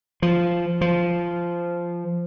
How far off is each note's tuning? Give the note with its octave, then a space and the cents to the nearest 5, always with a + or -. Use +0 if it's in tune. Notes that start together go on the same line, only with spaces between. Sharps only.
F3 -10
F3 -10